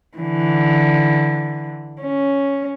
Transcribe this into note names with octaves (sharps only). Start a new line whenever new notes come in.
D3 E3
C#4